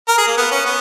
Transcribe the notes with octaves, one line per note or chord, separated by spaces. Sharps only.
A#4
G#4
A#3
B3
C#4
B3